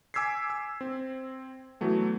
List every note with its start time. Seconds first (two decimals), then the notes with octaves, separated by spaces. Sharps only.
0.14 G#5 D6 E6 G#6 B6 C7
0.50 E6
0.81 C4
1.81 E3 F#3 A3 B3